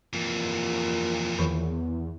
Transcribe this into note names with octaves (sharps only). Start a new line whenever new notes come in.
F2 A#2 E3
E2 D#3 F3